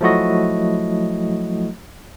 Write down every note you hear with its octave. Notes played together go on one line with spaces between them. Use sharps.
F3 F#3 A3 E4 F#4 D#5